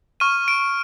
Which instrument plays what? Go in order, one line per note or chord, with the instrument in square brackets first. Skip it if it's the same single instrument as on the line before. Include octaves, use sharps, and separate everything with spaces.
[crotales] C#6 F6 D#7
D7